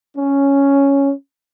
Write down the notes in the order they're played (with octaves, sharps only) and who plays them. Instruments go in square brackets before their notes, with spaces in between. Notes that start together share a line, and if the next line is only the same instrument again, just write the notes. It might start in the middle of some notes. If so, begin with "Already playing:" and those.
[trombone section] C#4